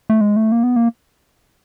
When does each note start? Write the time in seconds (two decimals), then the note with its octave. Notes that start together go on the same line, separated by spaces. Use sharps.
0.10 A3
0.21 G#3
0.36 A3
0.52 A#3
0.63 B3
0.76 A#3